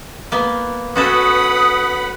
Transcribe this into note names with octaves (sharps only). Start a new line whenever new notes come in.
A#3 B3
C#4 F#4 A4 B4 F#5 B5 D#6